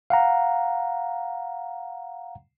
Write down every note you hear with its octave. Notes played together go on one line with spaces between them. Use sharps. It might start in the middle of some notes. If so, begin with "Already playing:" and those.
F5 F#5 A#5